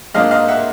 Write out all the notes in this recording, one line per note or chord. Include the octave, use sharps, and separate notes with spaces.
G#2 F3 A#3 D4 D#5 F5
D#5 F5
E5 F#5